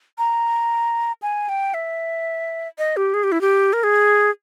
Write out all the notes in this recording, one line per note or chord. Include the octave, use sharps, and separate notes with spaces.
A#5
G#5
G5
E5
D#5
G4
G#4
G4
E4
G4
A#4
G#4